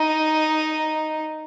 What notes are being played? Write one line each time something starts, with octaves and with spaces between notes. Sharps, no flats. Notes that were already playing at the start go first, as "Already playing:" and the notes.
Already playing: D#4